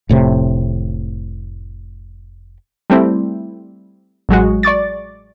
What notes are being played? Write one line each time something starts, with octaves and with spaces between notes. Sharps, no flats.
F1 A2 C3
G3 A3 C4 E4
A1 F#3 G#3 F#4
D5 C#6 D6 A6